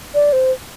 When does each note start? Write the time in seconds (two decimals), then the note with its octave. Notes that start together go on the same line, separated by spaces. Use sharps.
0.15 D5
0.33 C5